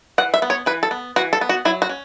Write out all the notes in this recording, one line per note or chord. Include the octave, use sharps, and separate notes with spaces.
E3 F#5
E5
B3
C#5
E3 B4
A4
B3
E3 F#4
A4
B3
F#4
F#3 E4
F#4
C#4